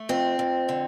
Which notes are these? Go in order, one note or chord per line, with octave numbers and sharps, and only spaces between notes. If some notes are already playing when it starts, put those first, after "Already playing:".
Already playing: A3
F2 C4
F2
D3